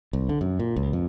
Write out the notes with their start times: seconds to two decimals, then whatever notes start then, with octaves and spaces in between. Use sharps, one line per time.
0.13 C2
0.29 D3
0.41 F#2
0.59 A#2
0.76 C#2
0.93 F2